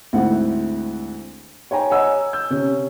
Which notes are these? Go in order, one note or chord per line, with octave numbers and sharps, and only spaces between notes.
D2 G#2 C4 E4 F#5
C#5 G5 G#5 A#5
C#5 D#5 F#5 G#5 A#5 E6
E6 G6
C3 C#4